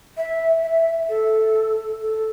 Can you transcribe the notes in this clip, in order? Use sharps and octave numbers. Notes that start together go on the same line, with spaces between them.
E5
E5
A4
A4